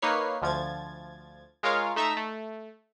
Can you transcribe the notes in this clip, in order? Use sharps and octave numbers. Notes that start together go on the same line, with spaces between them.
A#3 D#4 B4 C#5 C7
D2 F3 G#6 A6
G#3 F4 A#4 C#5 F5
A3 D#4 E5 A#5 E6
A3